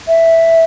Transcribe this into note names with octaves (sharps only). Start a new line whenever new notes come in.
E5